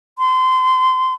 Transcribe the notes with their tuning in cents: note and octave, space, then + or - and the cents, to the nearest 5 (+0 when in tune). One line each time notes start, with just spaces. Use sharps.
C6 -25